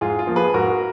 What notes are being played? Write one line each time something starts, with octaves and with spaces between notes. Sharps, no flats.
G#2 F4 G#4
F4
F3 A#3
G#4 B4
G#2 F#4 A#4